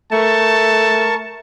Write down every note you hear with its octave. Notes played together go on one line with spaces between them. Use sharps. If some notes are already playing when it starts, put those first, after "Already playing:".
A3 A#4 A5 C#6